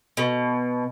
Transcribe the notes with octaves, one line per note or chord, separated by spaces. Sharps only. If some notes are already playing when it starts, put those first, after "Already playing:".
B2